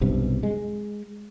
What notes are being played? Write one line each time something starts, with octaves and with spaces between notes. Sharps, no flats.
B1 G2 C3
G#3